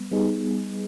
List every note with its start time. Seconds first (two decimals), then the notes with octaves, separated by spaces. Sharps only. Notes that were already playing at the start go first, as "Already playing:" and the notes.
Already playing: G3 B3
0.11 G3 B3 D#4 G#4